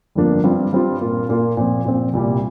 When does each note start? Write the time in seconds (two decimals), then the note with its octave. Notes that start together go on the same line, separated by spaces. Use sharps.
0.15 G1 F2 F3 A#3 D4
0.44 G2 G3 C4 F4
0.73 G2 G3 C4 F4
1.01 A#2 A#3 F4
1.29 A#2 A#3 F4
1.57 A#2 F3 C4
1.85 A#2 F3 C4
2.13 C2 A#2 G3